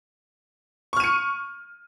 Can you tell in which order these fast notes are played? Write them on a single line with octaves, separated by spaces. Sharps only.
C#6 F6 D#7 C#7